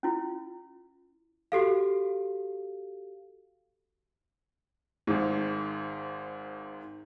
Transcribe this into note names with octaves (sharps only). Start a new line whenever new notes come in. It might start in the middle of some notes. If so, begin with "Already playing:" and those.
C#4 E4 F4
F#4 G4 A4 F5
G#1 G#2